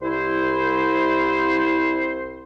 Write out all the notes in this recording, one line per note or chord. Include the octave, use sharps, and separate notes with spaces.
C2 E4 C5